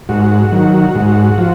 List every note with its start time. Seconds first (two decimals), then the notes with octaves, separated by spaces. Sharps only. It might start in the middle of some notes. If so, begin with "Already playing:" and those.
0.09 G#2 F#4
0.52 D#3 F#3
0.95 G#2
1.38 F3